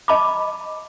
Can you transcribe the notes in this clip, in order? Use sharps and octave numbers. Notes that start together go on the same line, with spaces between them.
D#5 A5 B5 D6